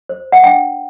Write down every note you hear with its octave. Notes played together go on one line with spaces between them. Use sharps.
C5
F#5
D4 G5